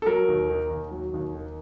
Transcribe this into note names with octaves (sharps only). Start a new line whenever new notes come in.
A4
F#3 A#4
D#2
D#3
D#2
F#3
D#2
D#3